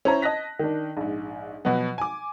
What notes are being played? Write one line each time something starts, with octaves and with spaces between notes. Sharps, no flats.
C#4 E4 C5 C#5 A#5
D#5 A5 F#6 A#6 B6
D#3 D4
A#1 G#2
B2 F3 F#3 B3
G#5 D6